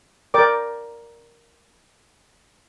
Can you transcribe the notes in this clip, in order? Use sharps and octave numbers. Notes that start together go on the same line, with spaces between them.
A#4 D5 G5 D6